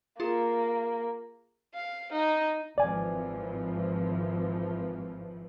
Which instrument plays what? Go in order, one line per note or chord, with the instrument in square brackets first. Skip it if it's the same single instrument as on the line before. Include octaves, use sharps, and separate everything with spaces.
[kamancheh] A#3 [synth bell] F4 G#4
[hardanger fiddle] F5
D#4
[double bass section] G#1 E3 F3 [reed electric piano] D5 G#5